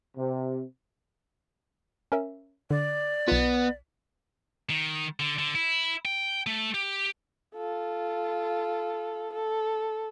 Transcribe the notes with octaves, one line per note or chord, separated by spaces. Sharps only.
C3
C#4 A#4 E5
D3 D5
B1 B3 D#4 F4
D#3
D3
D3
E4
G5
A3
G4
F4 A4
A4